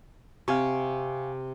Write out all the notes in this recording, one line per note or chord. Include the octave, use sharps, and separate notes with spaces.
C3 F5 G#5 C#6